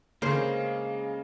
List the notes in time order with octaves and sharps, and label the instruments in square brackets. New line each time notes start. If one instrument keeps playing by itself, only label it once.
[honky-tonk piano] C#3 C#4 [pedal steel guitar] G#3 F5 [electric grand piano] A#3 [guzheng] C5